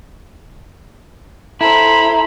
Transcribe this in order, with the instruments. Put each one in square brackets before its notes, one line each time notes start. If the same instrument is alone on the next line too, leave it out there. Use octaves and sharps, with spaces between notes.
[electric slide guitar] E4 [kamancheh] A4 C5 [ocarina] A#5 [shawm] B5